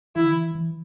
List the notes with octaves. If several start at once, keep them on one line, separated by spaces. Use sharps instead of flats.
E3 E4
D3
E3
E3